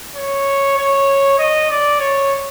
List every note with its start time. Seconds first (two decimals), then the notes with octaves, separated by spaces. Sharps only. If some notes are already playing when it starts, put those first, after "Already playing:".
0.16 C#5
0.78 C#5
1.39 D#5
1.70 D5
2.00 C#5